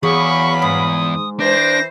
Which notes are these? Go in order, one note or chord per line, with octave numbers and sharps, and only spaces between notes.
E2 F#3 G#4 F5 B5 C#6
G#2 D#6
E3 D4 C5 A#6